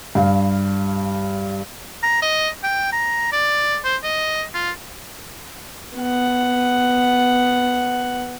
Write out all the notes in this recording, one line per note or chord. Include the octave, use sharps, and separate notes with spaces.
G2 F5
A#5
D#5
G5
A#5
D5
C5
D#5
F4
B3 F#5